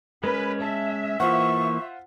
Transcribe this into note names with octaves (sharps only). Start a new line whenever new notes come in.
G#3 C#4 A#4 B4
E5 A5
E3 A#3 F4 C5 F#5 C#6